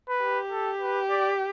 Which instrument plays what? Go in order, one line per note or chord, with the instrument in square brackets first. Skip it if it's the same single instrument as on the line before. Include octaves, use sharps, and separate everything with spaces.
[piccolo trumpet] B4
[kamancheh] G4
[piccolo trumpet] A4
B4
D5